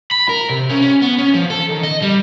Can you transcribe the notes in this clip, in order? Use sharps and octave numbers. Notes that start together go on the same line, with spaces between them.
B5
A#4
C3
C#4
C#4
B3
C#4
F3
A4
D#3
D#5
G3